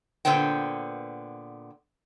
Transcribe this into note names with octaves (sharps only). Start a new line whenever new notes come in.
A#2 D3 B3 C5 G5